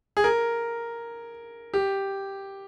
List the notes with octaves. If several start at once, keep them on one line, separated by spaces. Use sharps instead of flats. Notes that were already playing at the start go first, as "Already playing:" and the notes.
G#4
A#4
G4